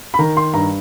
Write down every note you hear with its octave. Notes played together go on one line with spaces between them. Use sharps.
B5
D#3 A#5
C6
G2 A#5